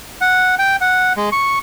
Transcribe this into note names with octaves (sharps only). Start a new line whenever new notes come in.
F#5
G5
F#5
G#3
C#6